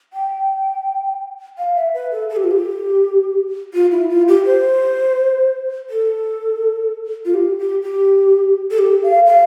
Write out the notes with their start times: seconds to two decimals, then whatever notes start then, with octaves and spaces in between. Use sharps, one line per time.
0.13 G5
1.58 F5
1.75 E5
1.94 B4
2.12 A4
2.30 A4
2.36 G4
2.44 F4
2.51 G4
3.74 F4
3.92 E4
4.10 F4
4.28 G4
4.46 C5
5.90 A4
7.25 F4
7.34 G4
7.58 G4
7.82 G4
8.71 A4
8.78 G4
9.03 F5
9.26 F5